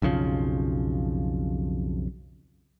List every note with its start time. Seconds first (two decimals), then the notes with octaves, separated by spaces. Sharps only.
0.02 B1 F2 C#3 F3